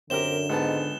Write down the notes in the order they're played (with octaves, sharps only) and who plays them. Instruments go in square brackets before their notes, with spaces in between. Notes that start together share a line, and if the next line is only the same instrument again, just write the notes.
[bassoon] F#2 [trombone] D3 [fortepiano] C4 G4 A#4 [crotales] E7 G7
[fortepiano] C#2 B3 A5 [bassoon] G#2